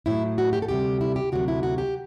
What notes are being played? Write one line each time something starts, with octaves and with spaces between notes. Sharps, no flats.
A2 F#3 E4
F#4
G4
A4
D2 C3 G3 G4
E4
G4
D2 C3 F#3 F#4
E4
F#4
G4